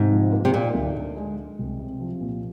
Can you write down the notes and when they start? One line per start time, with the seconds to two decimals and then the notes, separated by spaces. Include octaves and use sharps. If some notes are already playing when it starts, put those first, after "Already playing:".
Already playing: G#2 C3
0.12 F3
0.33 A#3
0.45 C3
0.53 A#2 D#4
0.75 D2
0.95 D3
1.17 G#3
1.37 G#3
1.59 C2
1.79 C3
2.00 F3
2.21 A#2